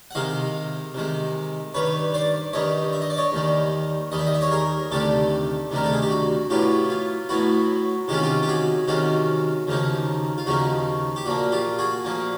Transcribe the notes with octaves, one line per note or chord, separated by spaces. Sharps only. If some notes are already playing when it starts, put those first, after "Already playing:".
F#5
C3 D#3 G#3 D#5 F5
C3 D#3 G#3
G2 D#3 G3 B4 C#5
C5 D5
G2 D#3 G3 C#5 D#5
E5
D#5
D5
C#5 D#5
D#2 D#3 G3
D#2 D#3 G3 D#5
E5
D#5
E5
C#5 D#5
G#4 A#4
D2 C3 D#3 G3 G4 A4
D2 C3 D#3 G3 A#4
A4
G#4
G4
F#4
A2 F#3 B3 E4 F4 G4
F4
A2 F#3 B3 E4 F#4
C3 D#3 G#3 C#4 F4 G4
F#4
F4 G4
G4
F#4 G#4
C3 D#3 G#3 C#4 F4 F#4
D#2 C#3 F3 A#3 D#4
F4
D#2 C#3 F3 A#3 D#4 F#4
G4
A#2 F3 A#3 F#4
F4 G4
F#4 G#4
A#2 F3 A#3